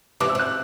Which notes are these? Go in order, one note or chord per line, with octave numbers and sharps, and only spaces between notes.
C3 E3 D6
E6
C3
F#6